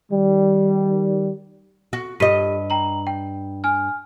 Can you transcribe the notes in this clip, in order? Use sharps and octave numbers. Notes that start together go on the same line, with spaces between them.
D#3 G3
F#4
G2 G4 D#5 B6 D#7
G5 A#5 F#7
G5
G#5 F6